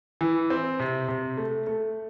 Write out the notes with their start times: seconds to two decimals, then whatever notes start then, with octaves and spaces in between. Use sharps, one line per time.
0.21 E3
0.50 C4
0.80 C3
1.08 C3
1.37 A3
1.67 A3